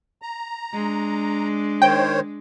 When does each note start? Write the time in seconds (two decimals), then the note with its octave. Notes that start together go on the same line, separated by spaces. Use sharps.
0.22 A#5
0.74 G#3 D4
1.82 D#3 C5 C#5 G5